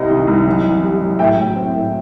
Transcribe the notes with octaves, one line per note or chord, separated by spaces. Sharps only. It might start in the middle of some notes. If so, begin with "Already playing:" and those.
Already playing: C2 C3 D#5
D#3
C2
F#2
E3
G3
F#2
A2 E5 G5
F#3
C4
A2